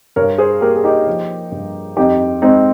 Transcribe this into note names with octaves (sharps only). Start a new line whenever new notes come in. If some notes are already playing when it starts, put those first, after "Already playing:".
G2 A#4 C#5
G#4 C5
A#3 G4 A#4
G#4
D#4 G4
F3
G2
F2 D#4 G4
G#3 C4 D#4